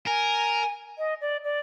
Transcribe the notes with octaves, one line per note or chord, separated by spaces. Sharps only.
A#4 G#5
D#5
D5
D5